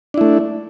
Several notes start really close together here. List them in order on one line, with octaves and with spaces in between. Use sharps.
D4 E4 A3